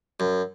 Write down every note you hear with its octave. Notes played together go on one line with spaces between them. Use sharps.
F#2